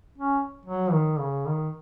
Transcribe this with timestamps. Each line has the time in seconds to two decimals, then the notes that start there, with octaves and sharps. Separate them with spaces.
0.18 C#4
0.66 F#3
0.92 D#3
1.19 C#3
1.46 D#3